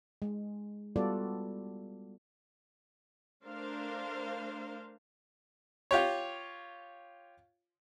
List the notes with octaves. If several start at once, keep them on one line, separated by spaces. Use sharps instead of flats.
G#3
G3 B3 F4 F#4 A4 D5
A3 D4 A#4 C5 F5
F4 G4 C#5